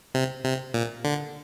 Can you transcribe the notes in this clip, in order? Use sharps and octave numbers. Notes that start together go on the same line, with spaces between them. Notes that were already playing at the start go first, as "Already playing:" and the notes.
C3
C3
A#2
D3